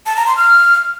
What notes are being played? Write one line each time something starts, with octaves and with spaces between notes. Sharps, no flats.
A5
A#5
C6
F6